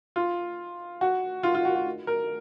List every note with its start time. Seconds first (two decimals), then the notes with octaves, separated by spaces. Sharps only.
0.16 F4
1.01 F#4
1.43 F4
1.55 F4
1.65 F#4
1.75 F#4
2.07 A#4